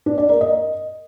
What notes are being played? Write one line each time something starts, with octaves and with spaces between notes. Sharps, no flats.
D4
D5
A#4
D#5